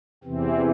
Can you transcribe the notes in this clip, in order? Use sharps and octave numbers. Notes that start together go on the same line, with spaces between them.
E2 C3 E3 C4